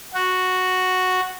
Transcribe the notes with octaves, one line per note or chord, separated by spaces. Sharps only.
F#4